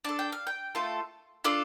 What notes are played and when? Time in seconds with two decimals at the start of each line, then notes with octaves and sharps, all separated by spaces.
0.05 D4 A4 A5
0.19 G5
0.32 F5
0.47 G5
0.75 A3 F4 A4
1.44 D4 F4 A4